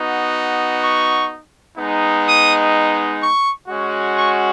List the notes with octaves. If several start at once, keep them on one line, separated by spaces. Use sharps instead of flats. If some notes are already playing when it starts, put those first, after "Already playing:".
Already playing: B3 D#4 F#4
C#6
G#3 B3 D#4
D#6
C#6
G#3 C#4 F#4
C#6